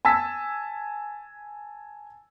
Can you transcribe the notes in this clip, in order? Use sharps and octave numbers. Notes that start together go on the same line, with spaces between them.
G#5 A5 E6 B6